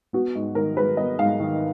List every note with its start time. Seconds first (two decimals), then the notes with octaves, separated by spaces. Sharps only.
0.13 B3 F#4
0.35 G#2
0.55 D#3 A#4
0.77 G#3 B4
0.97 B3 D#5
1.19 G#2 F5
1.40 D#3